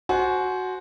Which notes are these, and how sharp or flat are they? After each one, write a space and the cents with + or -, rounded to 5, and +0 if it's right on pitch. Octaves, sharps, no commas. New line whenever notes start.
F#4 +0 C5 +0 G#5 +40